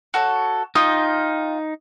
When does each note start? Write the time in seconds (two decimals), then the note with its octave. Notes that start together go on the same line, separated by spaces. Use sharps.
0.14 F#4 A4 C#5
0.75 D#4 F4 G5 D#6